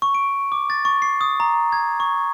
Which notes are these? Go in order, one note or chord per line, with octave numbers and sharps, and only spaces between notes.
C#6
D7
D6
A6
C#6
C7
D#6
A#5
G#6
C#6